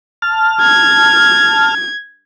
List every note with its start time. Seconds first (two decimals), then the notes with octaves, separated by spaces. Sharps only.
0.22 A5 F6
0.62 G#6